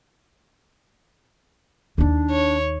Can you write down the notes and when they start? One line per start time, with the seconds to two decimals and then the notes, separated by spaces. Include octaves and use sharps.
1.98 D#2 D4 D#4
2.31 C#5